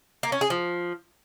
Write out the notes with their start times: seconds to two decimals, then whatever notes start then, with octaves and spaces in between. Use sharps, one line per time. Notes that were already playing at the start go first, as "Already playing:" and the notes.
0.23 A#3
0.32 C#4
0.41 G#4
0.50 F3